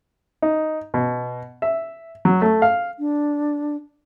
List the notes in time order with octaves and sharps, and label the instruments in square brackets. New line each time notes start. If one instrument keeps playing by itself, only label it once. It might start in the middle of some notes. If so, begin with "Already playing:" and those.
[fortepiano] D#4
B2
E5
F#3
A3
F5
[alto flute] D4